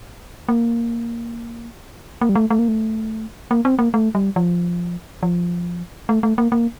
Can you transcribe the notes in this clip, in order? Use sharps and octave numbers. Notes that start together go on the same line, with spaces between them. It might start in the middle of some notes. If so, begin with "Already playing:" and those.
A#3
A#3
G3
A3
A3
A#3
A3
A#3
C4
A#3
A3
G3
F3
F3
A3
A3
A#3
A#3